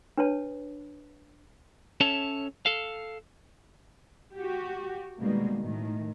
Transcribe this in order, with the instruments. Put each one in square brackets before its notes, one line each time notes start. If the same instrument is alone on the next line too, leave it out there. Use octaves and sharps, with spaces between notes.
[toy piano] D4 B4 C#5 A5
[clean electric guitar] C#4 A4 C#5 E5 A5
A4 F5
[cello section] F#4 G4
B2 D#3 G3 G#3 A#3
A2 D#3